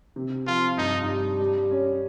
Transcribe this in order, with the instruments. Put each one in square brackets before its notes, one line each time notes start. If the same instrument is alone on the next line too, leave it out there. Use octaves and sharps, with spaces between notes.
[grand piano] C3
[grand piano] F3 [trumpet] F4
[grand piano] G2 [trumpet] D#4
[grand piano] G3
G3
C#4